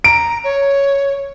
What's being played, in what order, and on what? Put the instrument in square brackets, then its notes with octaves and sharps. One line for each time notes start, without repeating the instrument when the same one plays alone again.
[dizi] A#5 [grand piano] D7
[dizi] C#5